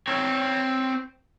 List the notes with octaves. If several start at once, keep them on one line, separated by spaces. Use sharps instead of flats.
C4 C#5